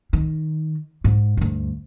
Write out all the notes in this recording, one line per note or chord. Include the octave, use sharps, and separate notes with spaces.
D#3
G#2
D2 G2